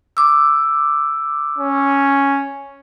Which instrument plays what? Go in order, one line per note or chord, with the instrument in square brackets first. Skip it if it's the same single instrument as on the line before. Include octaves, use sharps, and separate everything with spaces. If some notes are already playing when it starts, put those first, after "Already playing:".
[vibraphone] D6 E6
[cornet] C#4